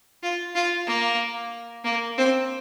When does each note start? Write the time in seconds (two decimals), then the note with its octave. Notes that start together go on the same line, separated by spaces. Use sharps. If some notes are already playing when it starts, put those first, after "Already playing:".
0.23 F4
0.55 F4
0.87 A#3
1.84 A#3
2.18 C4